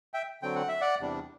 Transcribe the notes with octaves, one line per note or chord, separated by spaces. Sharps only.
E5 G5
D3 F#3 C4 G5
F#5
E5
D5 F#5
E2 C3 G3 D4